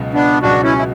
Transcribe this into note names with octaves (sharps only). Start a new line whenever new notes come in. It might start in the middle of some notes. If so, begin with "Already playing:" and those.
Already playing: C#2 B2 F#3
B3 D4
C#2 B2 F#3 D4 F#4
C#4 E4
E4